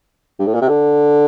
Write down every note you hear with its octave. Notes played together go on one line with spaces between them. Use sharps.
G2
A2
A#2
C3
D3